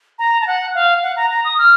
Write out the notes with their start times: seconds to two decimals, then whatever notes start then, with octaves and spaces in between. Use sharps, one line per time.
0.19 A#5
0.41 A5
0.47 F#5
0.75 F5
1.03 F#5
1.16 A#5
1.31 A#5
1.45 D#6
1.58 F6